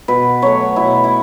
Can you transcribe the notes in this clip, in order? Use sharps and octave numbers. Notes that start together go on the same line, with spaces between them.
B2 B4
F#3 A3 C#5
B2 E4
E4